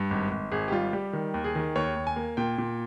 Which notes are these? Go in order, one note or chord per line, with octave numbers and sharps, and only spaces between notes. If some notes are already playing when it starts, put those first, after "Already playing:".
Already playing: G2
G#1
G#1
G#1 G#4
G4
G3 F4
G3 G4
D#3
D#2
G#4
D#3
D#2 C#5
D#2
G#5
A#3
A#2 G5
A#2